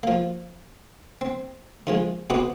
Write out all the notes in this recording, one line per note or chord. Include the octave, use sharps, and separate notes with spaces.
F3 A#3
C4
D#3 F3 G#3
B2 C4 F#4 B4 D#5 D6